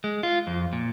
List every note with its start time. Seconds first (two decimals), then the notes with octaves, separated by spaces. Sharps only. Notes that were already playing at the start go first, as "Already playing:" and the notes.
0.04 G#3
0.23 F4
0.47 F2
0.73 A#2